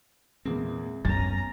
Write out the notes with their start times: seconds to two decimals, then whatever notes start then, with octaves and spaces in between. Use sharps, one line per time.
0.45 E2 A#2 G#3 C4
1.05 F#2 B3 C#4 A#5 A6